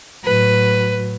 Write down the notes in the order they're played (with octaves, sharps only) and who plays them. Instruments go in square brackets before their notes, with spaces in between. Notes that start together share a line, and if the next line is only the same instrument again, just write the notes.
[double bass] A2 F#3 [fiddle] B4